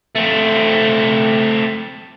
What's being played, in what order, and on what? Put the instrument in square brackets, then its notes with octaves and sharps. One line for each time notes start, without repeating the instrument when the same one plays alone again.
[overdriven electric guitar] A3 C4